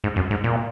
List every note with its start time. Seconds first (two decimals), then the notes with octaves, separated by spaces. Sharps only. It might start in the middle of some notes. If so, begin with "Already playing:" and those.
0.04 G#2
0.16 F#2
0.31 G#2
0.44 A#2